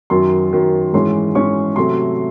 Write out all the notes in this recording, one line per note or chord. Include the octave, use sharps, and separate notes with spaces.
F#2 D#3 F#3 C6
F#2 D#3 F#3
G#2 E3 G#3 C#4 C6
G#2 E3 G#3 C#4 C#6
C3 F#3 A3 C6